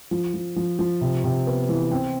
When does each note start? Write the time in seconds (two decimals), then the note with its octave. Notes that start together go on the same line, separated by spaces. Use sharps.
0.11 F3
0.34 F3
0.56 F3
0.79 F3
1.01 C3
1.24 C3
1.47 B3
1.69 E3
1.91 C4